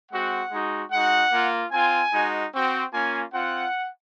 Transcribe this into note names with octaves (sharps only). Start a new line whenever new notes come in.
G#3 C4 F#4 F#5
G#3 D#4 F#4
G#3 D#4 F#4 F#5
A#3 F4
C4 F4 G#5
G#3 D#4 F#4
C4 F#4
A#3 C#4 F4 G#5
C4 F4 F#5